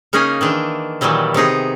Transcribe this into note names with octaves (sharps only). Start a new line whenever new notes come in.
C#3 A#3 C#4 D#4 G#4 G#5
D#3 E3 D4
A#2 D#3 E3 F#3 G3
C3 B3 D#4 G#4